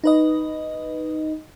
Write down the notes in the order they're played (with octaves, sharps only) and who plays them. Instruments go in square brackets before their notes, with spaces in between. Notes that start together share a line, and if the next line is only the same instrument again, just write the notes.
[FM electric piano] D#4 B4 D#5